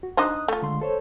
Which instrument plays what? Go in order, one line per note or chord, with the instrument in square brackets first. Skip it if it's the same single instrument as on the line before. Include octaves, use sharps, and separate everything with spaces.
[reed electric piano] F#4
[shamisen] D4 D#4 C5 [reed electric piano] D#6 F#6
[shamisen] A3 F4
[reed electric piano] D3 G#3 C6
A4 C5 C#5